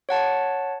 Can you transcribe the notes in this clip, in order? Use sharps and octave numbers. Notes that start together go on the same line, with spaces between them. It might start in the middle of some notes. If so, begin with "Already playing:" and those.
C#5 F#5 A5